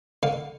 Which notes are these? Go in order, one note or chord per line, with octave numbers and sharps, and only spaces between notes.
D3 F5